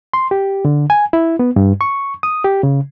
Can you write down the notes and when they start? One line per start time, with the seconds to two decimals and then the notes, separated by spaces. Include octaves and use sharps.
0.14 C6
0.31 G4
0.65 D3
0.90 G#5
1.13 E4
1.39 B3
1.56 G2
1.81 C#6
2.23 D#6
2.44 G4
2.63 C#3